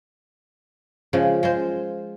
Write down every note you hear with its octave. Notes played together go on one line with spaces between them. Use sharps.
C#3 F3 G#3
G#3 F4 C5